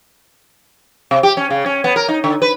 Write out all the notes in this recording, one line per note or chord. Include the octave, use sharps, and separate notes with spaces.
C3
G4
C#4
C#3
C#4
B3
A#4
D#4
D3
B4